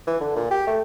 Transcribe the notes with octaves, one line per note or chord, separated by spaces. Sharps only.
E3
D3
A#2
G4
A3